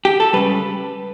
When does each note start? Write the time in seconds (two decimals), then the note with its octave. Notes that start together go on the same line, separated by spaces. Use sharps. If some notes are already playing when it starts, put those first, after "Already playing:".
0.05 G4
0.20 A4
0.33 C#2 C#3 G3 B4